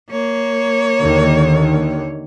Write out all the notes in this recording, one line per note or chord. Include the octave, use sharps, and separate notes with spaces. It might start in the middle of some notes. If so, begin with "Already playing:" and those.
A#3 C#5
D#2 D3 D#3